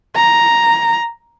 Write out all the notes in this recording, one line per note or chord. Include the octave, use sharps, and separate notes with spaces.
A#5